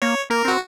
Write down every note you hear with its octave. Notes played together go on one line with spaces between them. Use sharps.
A#3 C#5
A#3 A#4
C4 F#4